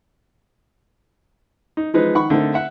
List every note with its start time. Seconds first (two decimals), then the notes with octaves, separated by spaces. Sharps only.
1.77 D#4
1.94 E3 F3 G#3 D#4 B4
2.15 D#3 F#5 B5 C#6
2.30 D3 A3 C4 D#4 A#4
2.54 E5 F#5